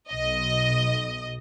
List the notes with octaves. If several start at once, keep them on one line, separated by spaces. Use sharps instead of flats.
B1 D#5